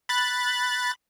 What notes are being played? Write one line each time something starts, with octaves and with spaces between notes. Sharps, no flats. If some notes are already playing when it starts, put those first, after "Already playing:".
B5 F#6 A6